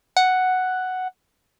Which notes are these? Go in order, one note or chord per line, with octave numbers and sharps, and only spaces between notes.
F#5